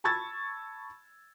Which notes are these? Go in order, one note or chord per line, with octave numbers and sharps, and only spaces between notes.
A5 B5 C#6 E6 G#6 A6